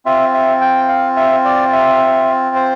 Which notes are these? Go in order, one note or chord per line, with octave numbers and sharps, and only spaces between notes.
C4 F4 E5
E5
G5
F5
E5
D5
E5
C5